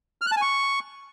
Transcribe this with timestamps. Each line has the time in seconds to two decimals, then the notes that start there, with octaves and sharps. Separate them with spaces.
0.22 F6
0.27 F#6
0.32 A5
0.37 G#5
0.42 C#6